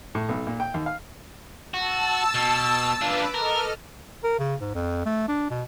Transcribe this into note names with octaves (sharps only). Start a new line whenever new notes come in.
A2
B1
A#2
G5
D#2
F5
F#4 A5 E6
B2
D4 F4 B4 D6
A4 A#4 D#5 F6
A#4
C#3
G#2
F2
A3
D4
B2